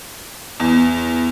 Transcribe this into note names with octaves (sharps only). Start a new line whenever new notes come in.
E2